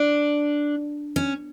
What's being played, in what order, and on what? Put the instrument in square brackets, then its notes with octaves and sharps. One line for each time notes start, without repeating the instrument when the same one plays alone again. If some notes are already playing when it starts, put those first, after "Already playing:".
Already playing: [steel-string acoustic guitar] D4
C#4